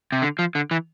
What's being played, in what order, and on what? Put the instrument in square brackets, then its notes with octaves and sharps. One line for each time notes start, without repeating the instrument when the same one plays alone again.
[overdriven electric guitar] C3
D3
F3
D3
E3